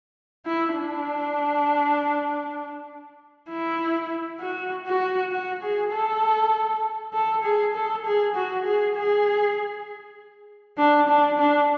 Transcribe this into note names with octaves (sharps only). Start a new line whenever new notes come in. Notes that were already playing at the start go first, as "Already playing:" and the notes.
E4
D4
E4
F#4
F#4
F#4
G#4
A4
A4
G#4
A4
G#4
F#4
G#4
G#4
D4
D4
D4